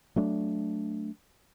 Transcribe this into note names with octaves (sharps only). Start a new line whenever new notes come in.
F#3 A3 D4